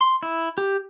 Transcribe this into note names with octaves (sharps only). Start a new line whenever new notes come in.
C6
E4
G4